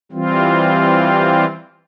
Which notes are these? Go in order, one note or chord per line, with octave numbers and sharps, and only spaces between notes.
E3 G3 C4 F4